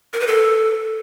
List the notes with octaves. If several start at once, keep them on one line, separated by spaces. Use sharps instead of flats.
A#4
B4
A4